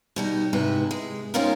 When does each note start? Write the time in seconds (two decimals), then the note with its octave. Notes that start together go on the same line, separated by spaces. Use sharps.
0.16 B2 G3 D#4
0.53 G#2 C3 E4 B4
0.91 G#3
1.34 G#3 C4 C#4 D#4 F4 A#4